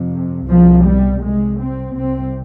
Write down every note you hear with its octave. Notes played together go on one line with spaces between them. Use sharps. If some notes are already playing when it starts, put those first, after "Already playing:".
Already playing: F2 C3
C2 B2 F3
G3
C2 C3 G#3
C4
C2 C3 C4